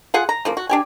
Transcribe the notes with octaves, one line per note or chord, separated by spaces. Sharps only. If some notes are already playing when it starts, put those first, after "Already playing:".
F4 G#4 F#5 G#5
A#5
C#3 F3 A#3
F#4
D4 G4 G#5